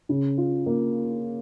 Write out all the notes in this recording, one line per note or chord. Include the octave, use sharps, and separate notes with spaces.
C#3
F4
A#3